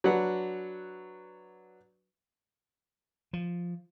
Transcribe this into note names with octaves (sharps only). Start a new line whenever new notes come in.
F#3 D4 B4 F#5
F3